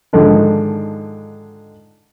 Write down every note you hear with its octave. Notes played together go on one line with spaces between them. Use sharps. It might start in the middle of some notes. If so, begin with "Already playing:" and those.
G#2 D3 D#3 F3